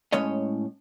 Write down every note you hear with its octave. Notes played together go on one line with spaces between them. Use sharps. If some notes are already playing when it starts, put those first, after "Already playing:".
A2 G#3 C#4 C#5 D#5